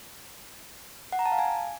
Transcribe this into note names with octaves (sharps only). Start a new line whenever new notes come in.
F#5
A#5
A5
F5
G#5